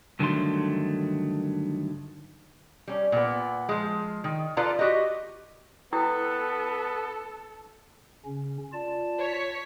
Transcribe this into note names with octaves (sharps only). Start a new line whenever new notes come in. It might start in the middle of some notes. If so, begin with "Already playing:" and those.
G2 D3 D#3 F#3 A3 C6
G3 C#4
A#2 B3
F3 G#3
D#3
F4 A4 B4 D5 F5 A#5
F#4 G4 B4 D#5
B3 E4 A4 B4 G5 D#6
C#3 C#4
F4 D5 A5
C#5 C#6 B6